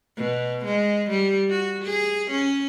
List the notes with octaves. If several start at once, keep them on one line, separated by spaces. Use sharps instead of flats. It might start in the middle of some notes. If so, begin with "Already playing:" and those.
B2
G#3
G3
F#4
G#4
C#4